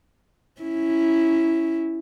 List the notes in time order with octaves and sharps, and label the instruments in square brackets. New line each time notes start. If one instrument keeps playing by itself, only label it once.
[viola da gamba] C#4 E4